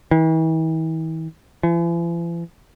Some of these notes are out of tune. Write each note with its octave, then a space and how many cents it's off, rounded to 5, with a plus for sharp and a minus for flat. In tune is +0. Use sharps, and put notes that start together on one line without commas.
E3 -40
E3 +45